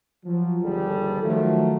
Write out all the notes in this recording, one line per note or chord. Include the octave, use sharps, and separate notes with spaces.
F3 F#3
G1 D#2 F3 G3 G#4 A4
D#3 F3 F#3 A3